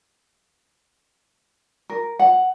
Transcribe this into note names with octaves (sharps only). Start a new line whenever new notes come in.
A#4
F#5